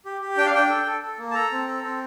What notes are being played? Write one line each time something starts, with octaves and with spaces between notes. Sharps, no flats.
G4
G4
D4 G5
F5
D4 G5
A4
A4
A4
A#3
A5
A4 A#5
C4
A4
C4